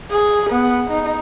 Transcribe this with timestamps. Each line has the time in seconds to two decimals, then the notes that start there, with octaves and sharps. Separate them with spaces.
0.11 G#4
0.50 B3
0.90 D#4